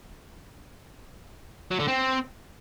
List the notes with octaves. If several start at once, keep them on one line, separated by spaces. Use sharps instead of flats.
F#3
D3
C4